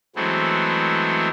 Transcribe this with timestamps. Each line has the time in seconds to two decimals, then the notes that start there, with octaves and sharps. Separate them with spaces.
0.16 E3 F#3 G#3 A3 B3 C4